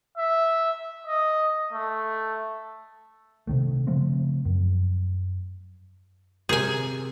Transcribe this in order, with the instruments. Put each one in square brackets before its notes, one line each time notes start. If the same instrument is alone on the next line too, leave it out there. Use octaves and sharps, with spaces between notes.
[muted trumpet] E5
D#5
A3
[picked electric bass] C3 D#3 A3
C#3 F3 A3 C4
F#2
[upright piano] C3 A#4 G6 [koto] G#4 G#5